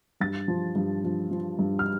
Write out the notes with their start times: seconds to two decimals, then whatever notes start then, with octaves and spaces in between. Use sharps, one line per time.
0.20 G2 A6
0.48 F3
0.76 G2
1.04 F3
1.31 F3
1.59 G2
1.79 F6